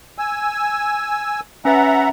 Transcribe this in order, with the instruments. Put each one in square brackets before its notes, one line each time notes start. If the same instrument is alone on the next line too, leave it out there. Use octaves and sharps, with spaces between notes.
[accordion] G#5 E6
[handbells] C#4 B4 A6 [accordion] E5 F#5 A#5